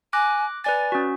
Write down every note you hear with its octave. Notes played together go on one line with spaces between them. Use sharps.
G#5 D6 F#6 A#6
B4 D5 G#5 A6
C#4 F#4